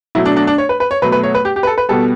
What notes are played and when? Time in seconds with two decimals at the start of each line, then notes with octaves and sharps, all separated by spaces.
0.15 B2 F#3 A3 E4
0.26 D4
0.36 D4
0.47 D4
0.58 C#5
0.69 B4
0.80 B4
0.91 C#5
1.02 B2 F#3 A3 B4
1.12 B4
1.23 C#5
1.35 B4
1.45 G4
1.56 G4
1.63 B4
1.67 A4
1.78 B4
1.89 B2 G3 B3 A4